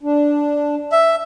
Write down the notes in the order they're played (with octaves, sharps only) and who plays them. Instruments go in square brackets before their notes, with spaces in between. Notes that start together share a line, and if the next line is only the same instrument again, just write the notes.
[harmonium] D4
[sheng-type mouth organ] E5